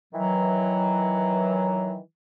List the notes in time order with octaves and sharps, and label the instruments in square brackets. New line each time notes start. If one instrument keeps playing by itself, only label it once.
[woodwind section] D#3 E3 F#3